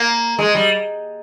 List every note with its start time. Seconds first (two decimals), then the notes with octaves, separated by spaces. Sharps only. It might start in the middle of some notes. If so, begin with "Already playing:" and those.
Already playing: A#3
0.39 G#3
0.55 G3